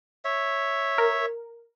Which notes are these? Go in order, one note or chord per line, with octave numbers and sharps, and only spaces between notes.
C#5 E5
A#4